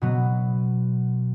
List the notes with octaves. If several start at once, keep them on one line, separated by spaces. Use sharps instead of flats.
B2 F#3 B3